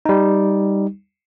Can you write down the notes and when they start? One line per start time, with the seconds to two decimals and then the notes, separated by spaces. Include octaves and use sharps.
0.05 G3 D#4